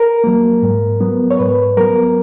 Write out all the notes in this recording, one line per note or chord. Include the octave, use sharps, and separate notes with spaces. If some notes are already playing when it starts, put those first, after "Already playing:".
Already playing: A#4
F#3 A#3
G#2
F#3 B3
C#5
G#2 B4
F#3 B3 A#4